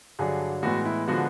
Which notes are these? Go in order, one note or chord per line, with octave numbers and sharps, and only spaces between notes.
G2 D3 F#3 G#4
A2 E3 G#3 B3 F#4
E4
D3 F3 G#3 B3 F#4